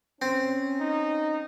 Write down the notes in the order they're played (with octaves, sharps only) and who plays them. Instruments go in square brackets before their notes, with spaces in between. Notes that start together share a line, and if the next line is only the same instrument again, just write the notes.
[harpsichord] C4 [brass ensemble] C#4
[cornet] D#4